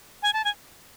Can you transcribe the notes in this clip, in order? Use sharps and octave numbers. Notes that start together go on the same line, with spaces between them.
G#5
A5
G#5